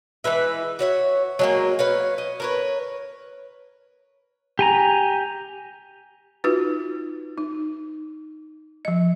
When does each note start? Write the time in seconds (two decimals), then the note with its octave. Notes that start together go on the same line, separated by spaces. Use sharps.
0.24 E3 G#3 B4 E5
0.79 F#4 C#5 E5
1.39 F#3 G#3 A#3
1.79 B4 C#5 F5
2.18 D#5
2.40 A#4 B4 C#5
4.59 G4 G#5 A#5
6.44 D#4 F4 F#4 B4
7.38 D#4
8.85 F3 D#5